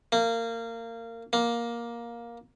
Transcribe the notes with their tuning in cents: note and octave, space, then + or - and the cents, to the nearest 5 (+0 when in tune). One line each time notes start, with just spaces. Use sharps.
A#3 -25
A#3 +10